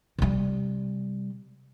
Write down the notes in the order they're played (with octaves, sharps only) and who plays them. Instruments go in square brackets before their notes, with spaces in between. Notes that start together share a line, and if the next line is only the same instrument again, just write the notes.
[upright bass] C3 G3